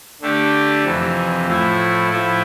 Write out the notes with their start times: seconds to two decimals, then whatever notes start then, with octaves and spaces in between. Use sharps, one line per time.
0.21 D3 A3 D4 G4
0.83 F2 C3 E3
1.46 A2 F3 A3 E4
2.10 A2 F3 A3 E4